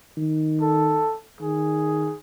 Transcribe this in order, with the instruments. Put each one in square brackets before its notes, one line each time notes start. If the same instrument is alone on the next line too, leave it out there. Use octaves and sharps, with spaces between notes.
[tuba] D#3
[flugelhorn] A4
[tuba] D#3 [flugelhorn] G#4